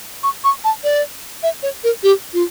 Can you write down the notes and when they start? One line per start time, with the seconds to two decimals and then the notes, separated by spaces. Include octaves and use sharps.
0.23 C#6
0.44 C#6
0.64 A5
0.84 D5
1.43 E5
1.63 C#5
1.84 A#4
2.03 G4
2.34 F4